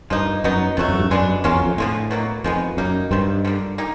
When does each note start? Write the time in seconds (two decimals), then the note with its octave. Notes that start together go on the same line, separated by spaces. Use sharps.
0.10 G2 F3 A#3 D#4
0.44 F#2 F#3 B3 D#4
0.77 F2 B2 F#3 A3
0.89 F#2
0.99 G2
1.10 F#2 G#3 B3 D4
1.44 E2 F#3 A#3 C#4 F4
1.56 F2
1.66 F2
1.77 A2 D3 F3 G#3
2.11 B2 F#3 A#3
2.44 F2 D#3 G#3 B3
2.77 F#2 G3 A#3 D#4
3.11 G2 D#3 G3 C4
3.45 D3 F3 A#3
3.78 A#3 D#4 G4